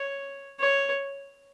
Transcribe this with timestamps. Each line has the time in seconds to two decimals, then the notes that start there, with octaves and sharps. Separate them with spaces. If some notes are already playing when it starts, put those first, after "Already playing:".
Already playing: C#5
0.60 C#5